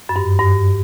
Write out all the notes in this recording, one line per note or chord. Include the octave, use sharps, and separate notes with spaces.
F#2
G2
G2